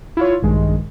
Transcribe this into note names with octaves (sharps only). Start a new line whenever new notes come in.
E4 F4 C#5
A#1 G2 D#3 G#3